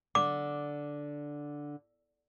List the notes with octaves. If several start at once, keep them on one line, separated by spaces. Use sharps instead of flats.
D3 D6